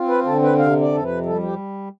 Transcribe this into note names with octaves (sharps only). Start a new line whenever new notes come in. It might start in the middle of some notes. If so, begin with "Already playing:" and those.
Already playing: C4 F4
B4
D3 A4
B4
C3 F5
D5
F2 A4
B4
G3 A4
G4